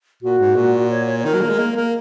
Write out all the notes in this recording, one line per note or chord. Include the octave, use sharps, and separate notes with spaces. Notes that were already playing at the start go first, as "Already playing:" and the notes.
A#2 F#4
G#2
A#2
C#5
C#5
C#5
D#3 A#4
F#3
A#3
G#3
A#3
A#3